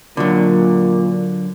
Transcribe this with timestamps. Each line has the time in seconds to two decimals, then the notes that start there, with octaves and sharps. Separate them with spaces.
0.17 A#2 D3 F#3